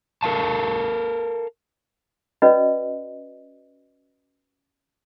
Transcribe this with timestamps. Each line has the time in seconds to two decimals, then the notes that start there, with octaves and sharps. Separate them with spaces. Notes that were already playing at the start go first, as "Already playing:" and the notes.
0.23 A4 A#4 E5 F5 A5
2.42 C#4 F#4 B4 D5 D#5